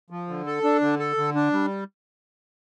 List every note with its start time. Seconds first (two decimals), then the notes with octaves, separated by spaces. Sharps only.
0.10 F3
0.28 D3
0.46 A4
0.64 D4
0.81 D3
0.99 A4
1.17 D3
1.35 D4
1.53 G3